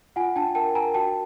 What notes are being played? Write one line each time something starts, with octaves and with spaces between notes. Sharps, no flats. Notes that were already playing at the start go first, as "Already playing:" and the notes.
F4 F#5 G#5
D4 G5 A5
A#4 G5 A5
A#4 G#5 A#5
F#4 G5 A5